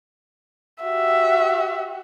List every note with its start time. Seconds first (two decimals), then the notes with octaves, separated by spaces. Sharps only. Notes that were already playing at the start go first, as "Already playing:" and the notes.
0.84 F#4 G4 E5